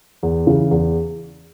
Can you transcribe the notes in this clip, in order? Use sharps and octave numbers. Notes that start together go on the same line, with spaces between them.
E2
C#3 E3
E2